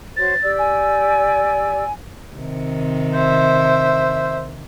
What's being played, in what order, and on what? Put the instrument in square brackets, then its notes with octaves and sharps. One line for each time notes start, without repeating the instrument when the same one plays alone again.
[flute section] F#4 C5 C#5 [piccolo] A6
[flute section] G4 D5 E6
[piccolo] G#5
[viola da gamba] C3 D#3
[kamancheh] C5 E5